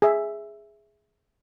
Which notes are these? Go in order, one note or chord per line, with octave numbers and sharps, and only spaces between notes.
G#4 E5